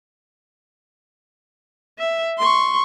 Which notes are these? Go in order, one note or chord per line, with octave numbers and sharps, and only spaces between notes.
E5
C6 C#6